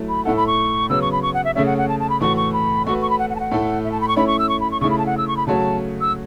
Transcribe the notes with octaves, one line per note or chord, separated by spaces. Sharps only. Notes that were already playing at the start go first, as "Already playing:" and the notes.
Already playing: F#3 A3 E4
B5
A2 A3 E4 A4 F#5
B5
C#6
C#3 F#3 B3 E6
C#6
B5
C#6
F#5
E5
C#3 A3 C#4 E5
F#5
F#5
A5
A5
B5
A2 E3 A3 F#4 C#6
C#6
B5
A3 F#4 B4 C#6
C#6
B5
F#5
F#5
A5
F#5
A2 A3 E4 A4
E5
A5
B5
C#6
A3 C#4 E4 C#5 B5
C#6
E6
C#6
B5
C#6
C#3 A3 E4 C#6
B5
A5
F#5
E6
C#6
B5
C#3 F#3 A3 F#4 C#5 A5
E6